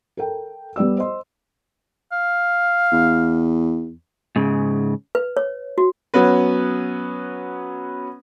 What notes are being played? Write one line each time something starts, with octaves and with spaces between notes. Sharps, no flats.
A4 A#4 G5
G3 B3 D5 E6
C5 D#5 C6
F5
E2
G#2 C#3
B4
C#5
F#4
F#3 B3 C#4 B4